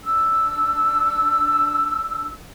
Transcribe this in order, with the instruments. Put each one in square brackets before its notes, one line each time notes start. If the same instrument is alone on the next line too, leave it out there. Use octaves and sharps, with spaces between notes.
[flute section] D4 E6